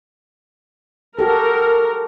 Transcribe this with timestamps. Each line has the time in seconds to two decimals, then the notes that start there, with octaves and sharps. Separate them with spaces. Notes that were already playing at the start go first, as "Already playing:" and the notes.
1.19 F#4 G4 A4 A#4